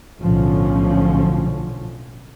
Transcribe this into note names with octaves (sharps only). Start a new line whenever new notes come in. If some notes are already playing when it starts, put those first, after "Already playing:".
B1 A2 D3 F3 C#4